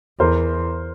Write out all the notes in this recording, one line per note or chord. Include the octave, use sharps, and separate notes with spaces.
E2 A#4 C5